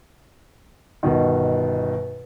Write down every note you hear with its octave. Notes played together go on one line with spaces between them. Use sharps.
G1 B2 D#3